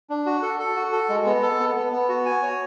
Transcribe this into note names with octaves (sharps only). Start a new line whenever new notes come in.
D4
F#4
A4
A4
F#4
A4
G#3
B3
A4
B3
B3
B3
F#4
G#5
C#5